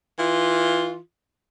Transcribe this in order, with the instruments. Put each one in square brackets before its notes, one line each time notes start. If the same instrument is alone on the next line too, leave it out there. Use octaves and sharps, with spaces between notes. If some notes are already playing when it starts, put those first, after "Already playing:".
[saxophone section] E3 F4